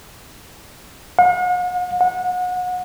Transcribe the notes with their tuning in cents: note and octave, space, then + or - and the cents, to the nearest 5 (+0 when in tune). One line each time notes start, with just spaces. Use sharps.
F#5 -45
F#5 -30